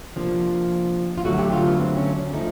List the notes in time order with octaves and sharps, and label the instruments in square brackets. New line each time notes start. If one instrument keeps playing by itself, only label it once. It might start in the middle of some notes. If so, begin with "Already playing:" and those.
[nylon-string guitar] C3 F3 A#3 D4
F4
D3 F#3 A3 F#4
G4
F4
B3
C4
C#4
D4
F3 A3 D#4